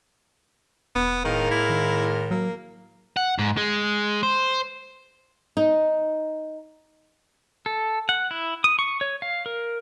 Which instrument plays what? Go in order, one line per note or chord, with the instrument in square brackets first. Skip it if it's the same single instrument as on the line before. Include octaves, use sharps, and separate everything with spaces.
[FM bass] E1 [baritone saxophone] B3
[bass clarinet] A2 [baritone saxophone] D#3 [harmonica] G#3 A#4 F5
[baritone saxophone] E4
[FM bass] D#3
[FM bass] F#3 [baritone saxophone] A#3
[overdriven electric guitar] F#5
G#2
G#3
C5
[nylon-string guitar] D#4
[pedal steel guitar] A4
F#5
E4
D#6
C#6
C#5
F5
A#4